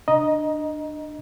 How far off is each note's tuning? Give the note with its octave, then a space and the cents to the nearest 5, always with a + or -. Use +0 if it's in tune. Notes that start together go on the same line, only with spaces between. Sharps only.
D4 +20 D#5 +0 A#5 +15